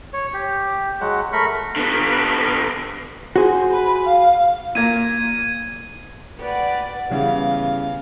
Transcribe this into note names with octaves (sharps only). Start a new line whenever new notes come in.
C#5
G4
F#3 G#3 F#5
A3 A#4 B5 C#6
D3 B3
F#4 G#4 C5
B4
F5
A#2 A#3 G#6 D#7
B3 F#4 G4 B4 D5
C#3 E3 G3 B3 F5